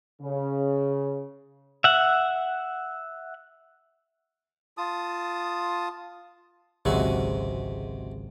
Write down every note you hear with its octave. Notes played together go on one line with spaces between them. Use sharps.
C#3
E5 F#5
F4 A5 D#6
G#1 C#2 C3 F#3 G#3 F#4